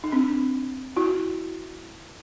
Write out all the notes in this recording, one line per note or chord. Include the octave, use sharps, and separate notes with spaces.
D#4
C4 D4
E4 F#4